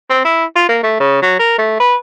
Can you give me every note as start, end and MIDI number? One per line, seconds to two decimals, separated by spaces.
0.10 0.23 60
0.25 0.45 64
0.56 0.64 65
0.69 0.78 58
0.83 0.99 57
1.00 1.19 49
1.22 1.38 54
1.39 1.56 70
1.58 1.78 57
1.80 1.96 71